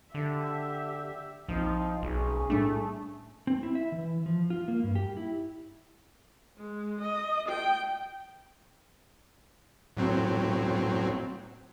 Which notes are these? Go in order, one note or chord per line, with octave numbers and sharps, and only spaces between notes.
D3 G4 E5
A#1 F3 C4 D#4
B1 C#4 G#4
A2 G3 A3 D4
C4
E4
E5
E3
F3
F4
A#3
G2
G4
E4
G#3
D#5
G5
A2 F#3 C4